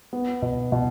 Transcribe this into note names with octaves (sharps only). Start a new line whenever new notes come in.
B3
B2
B2